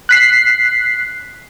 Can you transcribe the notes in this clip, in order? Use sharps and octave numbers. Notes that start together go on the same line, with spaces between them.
F#6 B6 C7